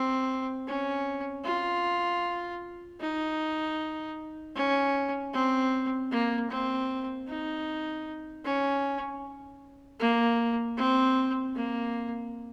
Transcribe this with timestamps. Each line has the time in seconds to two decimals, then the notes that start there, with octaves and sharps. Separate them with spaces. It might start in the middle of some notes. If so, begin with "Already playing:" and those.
Already playing: C4
0.68 C#4
1.45 F4
3.01 D#4
4.56 C#4
5.33 C4
6.11 A#3
6.51 C4
7.28 D#4
8.45 C#4
10.00 A#3
10.77 C4
11.55 A#3